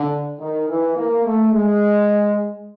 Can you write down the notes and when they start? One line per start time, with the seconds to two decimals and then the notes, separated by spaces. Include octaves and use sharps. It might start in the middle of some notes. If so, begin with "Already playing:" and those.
Already playing: D3
0.39 D#3
0.68 E3
0.96 A#3
1.24 A3
1.53 G#3